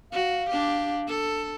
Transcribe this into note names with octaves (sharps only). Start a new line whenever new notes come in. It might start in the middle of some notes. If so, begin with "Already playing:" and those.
F#4 F5
D4 G4
A4